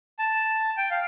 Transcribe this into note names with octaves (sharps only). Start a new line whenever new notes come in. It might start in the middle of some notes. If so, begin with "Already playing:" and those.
A5
G5
F5